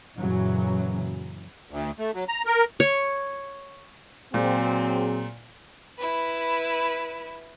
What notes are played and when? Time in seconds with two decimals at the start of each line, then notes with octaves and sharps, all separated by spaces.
0.17 F#2 A#2 C#3 E3 F#3
1.70 D2
1.99 A3
2.14 F#3
2.28 A#5
2.46 A#4
2.80 C#5
4.34 A#2 F#3 C4 G#4
5.98 E4 B4